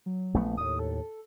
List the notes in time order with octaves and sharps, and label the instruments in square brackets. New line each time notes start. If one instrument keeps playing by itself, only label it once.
[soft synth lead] F#3
[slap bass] A#1 A3 B3
[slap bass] D#2 A2 [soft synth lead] D#6
[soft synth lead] A4